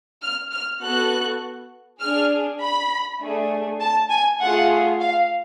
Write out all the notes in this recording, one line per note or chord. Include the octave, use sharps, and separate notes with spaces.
F6
F6
B3 F#4 A4 F#6
D4 G#4 F6
B5
A3 D4 G#4
A5
G#5
A3 F4 G#4 F#5
F5